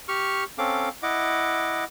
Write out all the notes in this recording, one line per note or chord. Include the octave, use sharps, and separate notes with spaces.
G4 C#6 F6
C4 C#4 A4 F5 D6
E4 D#5 F#5 D6